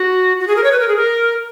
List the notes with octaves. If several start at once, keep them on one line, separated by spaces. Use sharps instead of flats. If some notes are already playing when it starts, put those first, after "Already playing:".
Already playing: F#4
F#4
G#4
A#4
C#5
B4
A#4
G#4
A#4